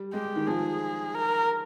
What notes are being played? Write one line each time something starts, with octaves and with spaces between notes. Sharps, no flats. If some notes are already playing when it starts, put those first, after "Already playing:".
Already playing: G3
G#3 G4
D#3
F3 G#4
A#4